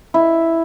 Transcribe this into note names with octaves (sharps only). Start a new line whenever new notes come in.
E4